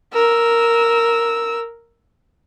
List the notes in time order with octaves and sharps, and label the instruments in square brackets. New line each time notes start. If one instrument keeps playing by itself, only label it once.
[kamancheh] A#4 E6